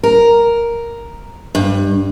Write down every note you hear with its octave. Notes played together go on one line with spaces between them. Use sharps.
A#4
G2